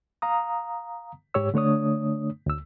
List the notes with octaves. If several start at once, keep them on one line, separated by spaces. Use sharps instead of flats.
F5 A#5 D#6
G#2 G4 C#5 E6
D3 A3 D4 C#5 D#6
D2 E6